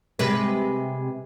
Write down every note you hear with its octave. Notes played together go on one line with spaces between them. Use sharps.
C3 G#3 B4